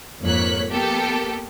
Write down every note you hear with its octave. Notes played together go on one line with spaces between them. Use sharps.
F2 G#2 A#3 C#5 F#6 B6
A#3 B3 G4 A4